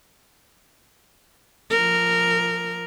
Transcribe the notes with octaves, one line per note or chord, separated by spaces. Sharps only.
F3 A#4